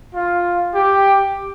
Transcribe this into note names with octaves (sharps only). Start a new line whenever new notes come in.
F4
G4